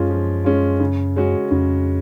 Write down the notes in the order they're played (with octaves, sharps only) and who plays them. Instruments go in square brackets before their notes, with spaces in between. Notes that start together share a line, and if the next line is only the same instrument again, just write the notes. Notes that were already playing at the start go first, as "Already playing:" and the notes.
Already playing: [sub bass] F#2 [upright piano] F3 G#3 C#4 F4
[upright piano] F3
G#3 C#4 F4
C#3
G#3 C#4 F#4
[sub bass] F2 [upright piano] C#3